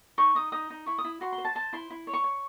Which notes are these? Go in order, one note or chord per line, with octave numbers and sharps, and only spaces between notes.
D#4 C#6
D#4 D#6
D#4 D#6
D#4
E4 C#6
D#6
E4
F#4 C6
C6
C5
A5
C5 A5
E4 C6
E4
C#5
C#6
C#5